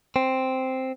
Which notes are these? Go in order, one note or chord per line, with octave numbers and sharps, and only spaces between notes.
C4